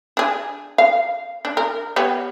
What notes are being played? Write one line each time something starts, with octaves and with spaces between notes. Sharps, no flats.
D4 G#4
F5
D4
A#4
G3 B3 C#5